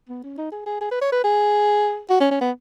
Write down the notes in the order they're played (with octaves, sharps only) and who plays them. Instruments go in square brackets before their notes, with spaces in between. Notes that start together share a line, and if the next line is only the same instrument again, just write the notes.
[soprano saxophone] B3
C#4
D#4
G#4
G#4
G#4
B4
C#5
B4
G#4
F#4
C#4
C#4
B3